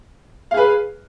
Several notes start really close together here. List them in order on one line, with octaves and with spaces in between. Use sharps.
F5 G#4 B4